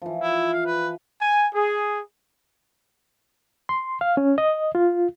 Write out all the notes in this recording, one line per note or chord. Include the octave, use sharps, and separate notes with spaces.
E3 F3
E4
F5
B4
G#5
G#4
C6
F5
C#4
D#5
F4